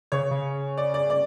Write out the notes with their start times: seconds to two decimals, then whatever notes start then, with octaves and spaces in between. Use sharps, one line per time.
0.12 C#3 C#5
0.31 C#3
0.78 D5
0.94 D5
1.10 D5